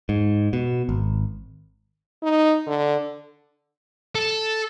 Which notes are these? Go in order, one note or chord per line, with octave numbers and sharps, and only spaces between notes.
G#2
B2
G#1
D#4
D3
A4